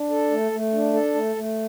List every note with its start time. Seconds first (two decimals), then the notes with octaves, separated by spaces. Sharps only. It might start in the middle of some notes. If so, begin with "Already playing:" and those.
Already playing: D4
0.10 A4
0.30 A3
0.51 A3
0.73 D4
0.93 A4
1.15 A3
1.35 A3